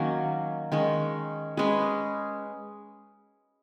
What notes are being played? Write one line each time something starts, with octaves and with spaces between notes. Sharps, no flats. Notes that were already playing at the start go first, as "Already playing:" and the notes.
Already playing: D#3 F#3 A#3 C#4
D#3 G#3 C#4
G#3 C#4 G#4 B4